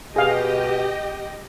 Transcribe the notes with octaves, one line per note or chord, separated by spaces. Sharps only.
B2 G4 G#4 D#5 F5 G5